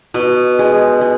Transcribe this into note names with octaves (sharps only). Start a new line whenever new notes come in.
B2
G#3
G#3